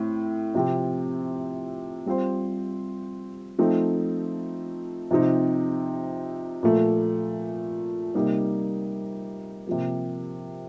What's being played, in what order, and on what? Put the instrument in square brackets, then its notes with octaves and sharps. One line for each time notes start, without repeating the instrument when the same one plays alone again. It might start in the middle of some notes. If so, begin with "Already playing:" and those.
Already playing: [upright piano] A2 C4
C3 F3 C4 G4
G3 C4 F4 C5
F3 A3 C4 D#4
C3 F3 C4 D#4
A#2 F3 A3
C3 G3 A#3 D#4 G4
C3 F3 A#3